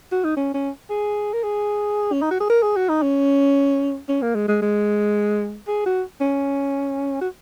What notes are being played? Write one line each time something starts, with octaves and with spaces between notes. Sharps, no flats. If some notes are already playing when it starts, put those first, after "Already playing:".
F#4
D#4
C#4
C#4
G#4
A#4
G#4
C#4
D#4
F#4
G#4
A#4
G#4
F#4
D#4
C#4
C#4
A#3
G#3
G#3
G#3
G#4
F#4
C#4
F#4